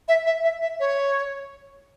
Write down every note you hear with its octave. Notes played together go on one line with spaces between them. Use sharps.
E5
E5
E5
E5
C#5